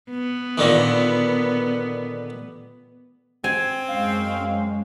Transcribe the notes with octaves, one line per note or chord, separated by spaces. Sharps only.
B3
A#2 D3 D#3
C4 G#5
F#2 G#3 C#4 F5